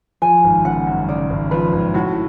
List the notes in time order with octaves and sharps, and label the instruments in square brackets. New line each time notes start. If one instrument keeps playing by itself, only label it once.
[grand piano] F3 [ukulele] G#5
[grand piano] G#1
[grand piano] C#3 [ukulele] F#5
[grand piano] F#2
[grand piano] C#3 [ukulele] D5
[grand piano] G#1
[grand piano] F3 [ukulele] B4
[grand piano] G#1
[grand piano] A2 [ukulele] F#4